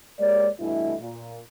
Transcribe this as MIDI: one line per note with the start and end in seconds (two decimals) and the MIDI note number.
0.20 0.48 56
0.20 0.48 58
0.20 0.48 67
0.20 0.48 73
0.20 0.48 74
0.60 0.95 43
0.60 0.95 47
0.60 0.95 52
0.60 0.95 57
0.60 0.95 64
1.01 1.38 46